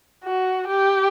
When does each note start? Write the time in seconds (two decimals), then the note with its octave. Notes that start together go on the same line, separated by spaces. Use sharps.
0.24 F#4
0.68 G4